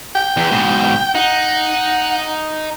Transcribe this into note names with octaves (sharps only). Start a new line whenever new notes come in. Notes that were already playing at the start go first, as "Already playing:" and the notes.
G5
E2
G#2 B2
D#4 F#5